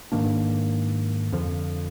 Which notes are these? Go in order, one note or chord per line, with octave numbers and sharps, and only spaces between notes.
G#2 D#3 A#3 D4
F2 D3 F3